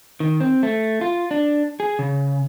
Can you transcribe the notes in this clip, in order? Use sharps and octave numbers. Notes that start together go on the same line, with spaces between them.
D#3
C4
A3
F4
D4
G#4
C#3